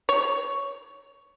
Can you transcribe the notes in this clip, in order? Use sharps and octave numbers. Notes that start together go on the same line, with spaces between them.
C#5